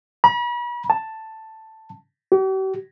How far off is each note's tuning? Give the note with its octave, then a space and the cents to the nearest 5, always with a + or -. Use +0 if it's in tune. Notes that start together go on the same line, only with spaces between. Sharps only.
B5 -40
A5 +5
G4 -45